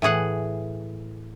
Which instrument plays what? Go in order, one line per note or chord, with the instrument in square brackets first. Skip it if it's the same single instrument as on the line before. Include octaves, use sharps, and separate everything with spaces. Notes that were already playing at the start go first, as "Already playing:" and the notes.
[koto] A2 E3 G#4 F#5